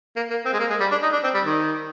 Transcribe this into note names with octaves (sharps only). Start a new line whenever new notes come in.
A#3
A#3
C4
G#3
A#3
G#3
G3
D4
D#4
D4
C4
G3
D#3